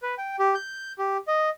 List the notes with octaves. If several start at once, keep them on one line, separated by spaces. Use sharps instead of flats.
B4
G5
G4
G6
G4
D#5